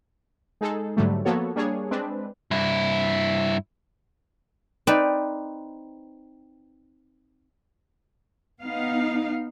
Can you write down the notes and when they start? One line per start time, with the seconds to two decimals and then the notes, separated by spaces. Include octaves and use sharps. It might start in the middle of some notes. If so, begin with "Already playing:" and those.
0.61 G#3 D#4 G#4 A4
0.97 G#2 D3 F#3 G3 A3
1.25 F3 A#3 B3 F#4 A4 C#5
1.56 G3 A#3 D4 G#4 C#5
1.91 G#3 C4 D4 B4
2.51 G2 E4
4.87 C4 D#4 B4 D5
8.62 B3 D#4 F5